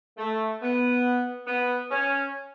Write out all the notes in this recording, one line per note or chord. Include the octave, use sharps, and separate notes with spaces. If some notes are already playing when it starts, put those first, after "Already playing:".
A3
B3
B3
C#4